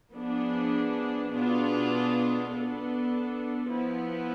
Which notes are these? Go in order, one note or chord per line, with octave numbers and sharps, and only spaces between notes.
F3 B3 D4 G#4
B2 B3 D4 F4 G#4
B3 D4 A4
F3 B3 E4